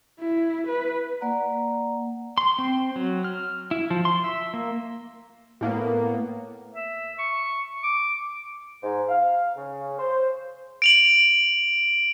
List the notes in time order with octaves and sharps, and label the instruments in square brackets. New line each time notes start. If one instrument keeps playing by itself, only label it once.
[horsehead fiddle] E4
B4
[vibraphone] A#3 D5 F#5 A#5
[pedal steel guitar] C6
C4
F#3
F6
E4
F3
C6
E5
A#3
[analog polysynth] A2 A#3 B3
[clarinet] E5
C#6
D6
[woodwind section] G#2
F5
C#3
C5
[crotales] D7 F7 F#7